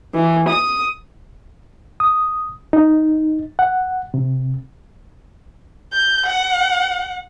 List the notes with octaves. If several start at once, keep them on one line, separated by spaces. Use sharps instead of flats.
E3
D#6
D#6
D#4
F#5
C3
G6
F#5